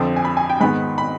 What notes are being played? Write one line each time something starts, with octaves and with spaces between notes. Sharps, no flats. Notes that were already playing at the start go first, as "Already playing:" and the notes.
Already playing: F2 D3 F3 C4
G#5
B5
G#5
G5
G#2 D#3 B3 B5
B5